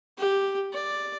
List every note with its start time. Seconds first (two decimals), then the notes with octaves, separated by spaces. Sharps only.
0.18 G4
0.73 D5